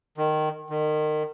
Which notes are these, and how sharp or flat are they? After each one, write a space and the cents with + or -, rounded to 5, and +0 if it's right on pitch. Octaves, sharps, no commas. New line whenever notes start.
D#3 -15
D#3 -30